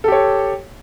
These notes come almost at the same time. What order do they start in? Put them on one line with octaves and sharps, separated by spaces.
A4 G4 C#5